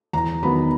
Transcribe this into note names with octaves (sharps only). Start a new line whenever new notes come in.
E2 A#5
D#3 F#3 B3 B5